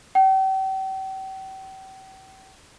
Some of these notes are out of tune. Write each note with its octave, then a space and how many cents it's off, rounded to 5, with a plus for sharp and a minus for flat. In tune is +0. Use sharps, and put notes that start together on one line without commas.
G5 -40